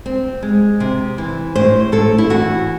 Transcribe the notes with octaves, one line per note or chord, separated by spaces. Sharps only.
C4
G#3
C3
E3
A2 C5
A2 A4
E4
E3 F#4